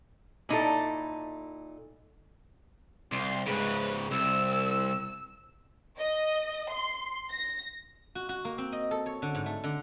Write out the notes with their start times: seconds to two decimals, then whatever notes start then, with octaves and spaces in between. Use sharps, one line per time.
0.49 A#2 D#4 E4 A4
3.12 C2 C6
3.47 G#2 C#3 B4
4.11 C2 E6
5.99 D#5
6.71 C6
7.31 A#6
8.15 F#4
8.29 F#4
8.45 A#3
8.58 C4
8.72 D#5
8.91 A4
9.06 C#5
9.22 D3
9.35 G#2
9.46 A3
9.64 D3